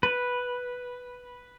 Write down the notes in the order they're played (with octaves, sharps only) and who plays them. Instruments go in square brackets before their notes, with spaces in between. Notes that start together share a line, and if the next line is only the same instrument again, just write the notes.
[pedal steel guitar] B4